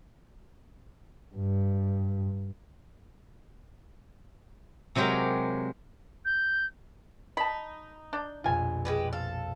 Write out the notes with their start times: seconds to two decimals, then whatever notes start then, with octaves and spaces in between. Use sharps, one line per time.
1.35 G2
4.95 C3 F#3 G#3 G4 G#4 A#4
6.25 G6
7.37 D#4 A5 B5
8.13 D4 G6
8.44 A#1 F2 B2 F4 G#5
8.85 G#3 G4 B4
9.13 A4 F5